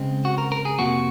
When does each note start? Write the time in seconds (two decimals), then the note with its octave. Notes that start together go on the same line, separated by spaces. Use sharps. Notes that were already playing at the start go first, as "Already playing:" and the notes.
Already playing: C#3 G#3 C4
0.25 F#4
0.38 A#4
0.52 A#4
0.65 G#4
0.79 F2 C3 F3 A#3 F#4